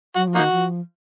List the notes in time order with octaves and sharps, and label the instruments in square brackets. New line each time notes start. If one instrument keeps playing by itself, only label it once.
[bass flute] F#3 [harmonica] F#4
[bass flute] F3
[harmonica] A#3 D#4 F#4
[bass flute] D#3
F3